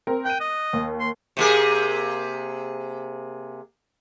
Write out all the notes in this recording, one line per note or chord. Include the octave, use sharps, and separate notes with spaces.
C4 A#4
G5 F#6 D#7
D#5
D#2
C6
C3 A#3 G#4